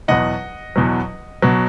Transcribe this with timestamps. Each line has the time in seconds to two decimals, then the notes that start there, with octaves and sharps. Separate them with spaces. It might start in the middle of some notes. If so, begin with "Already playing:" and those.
0.08 E2 B2 F#3 D#5 F#5
0.76 E2 B2 F#3
1.42 B2 F#3